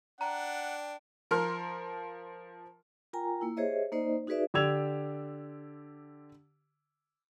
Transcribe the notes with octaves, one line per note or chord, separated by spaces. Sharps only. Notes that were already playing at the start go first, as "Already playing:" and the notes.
D4 F#5 G5 A#5
F3 A#4 C6 F6
F4 A#4 G5 G#5 A#5
A#3 E4
G4 G#4 C5 C#5 D#5 E5
A#3 D#4 C5 D5 D#5
D#4 F#4 G#4 B4 D5 E5
D3 G4 D5 E6 G#6 F7